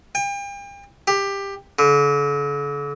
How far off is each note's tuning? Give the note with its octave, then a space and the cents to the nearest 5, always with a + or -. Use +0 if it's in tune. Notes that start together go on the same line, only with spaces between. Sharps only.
G5 +40
G4 +15
D3 -45